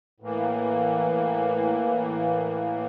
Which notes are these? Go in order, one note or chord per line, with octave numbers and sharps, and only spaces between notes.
A2 E3 A#3